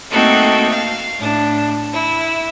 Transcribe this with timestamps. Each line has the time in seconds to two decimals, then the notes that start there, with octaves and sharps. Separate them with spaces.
0.11 A3 A#3 C4 D#4 F#4 A4
0.68 F5
1.19 A2 D4
1.93 E4